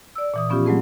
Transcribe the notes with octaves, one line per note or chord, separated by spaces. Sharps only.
D5 E6
A#2 E3 D#6
F3 B3 C#4 F4 G4
F#3 G#3 A3 C4 G#4